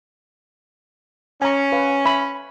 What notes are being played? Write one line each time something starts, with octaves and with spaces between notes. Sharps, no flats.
C#4 G#5 A#5
B4 F5
E5 B5